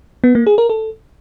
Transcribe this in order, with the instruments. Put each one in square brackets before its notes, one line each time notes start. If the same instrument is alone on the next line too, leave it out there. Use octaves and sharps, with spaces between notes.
[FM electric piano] B3
A#3
G#4
A#4
A4